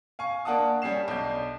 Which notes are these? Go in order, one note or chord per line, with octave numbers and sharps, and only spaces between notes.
F5 G#5 C#6
A#3 D4 F#5 A5 D#6
G3 C#4 C7 E7
B1 D4 G6